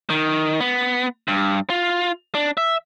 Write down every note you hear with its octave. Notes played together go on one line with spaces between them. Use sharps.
D#3
B3
G2
F4
D4
E5